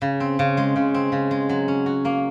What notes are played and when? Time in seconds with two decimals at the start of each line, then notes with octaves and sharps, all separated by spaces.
0.02 C#3
0.20 C4
0.39 C#3
0.57 G#3
0.76 C#3
0.94 C4
1.12 C#3
1.31 G#3
1.49 F#3
1.68 C#4
1.86 F#4
2.05 A#3